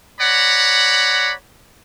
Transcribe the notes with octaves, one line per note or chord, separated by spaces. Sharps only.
C#5 D5 F#5 A#5 B5